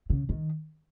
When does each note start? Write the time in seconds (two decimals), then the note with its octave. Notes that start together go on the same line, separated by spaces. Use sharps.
0.10 C#3
0.29 D#3